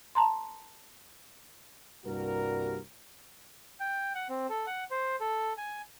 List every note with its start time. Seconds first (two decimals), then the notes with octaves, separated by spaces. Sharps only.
0.15 A5 A#5 C6
2.05 C2 G2 G3 A#3 F#4 A#4
3.80 G5
4.15 F#5
4.29 C4
4.49 A4
4.67 F#5
4.91 C5
5.20 A4
5.58 G#5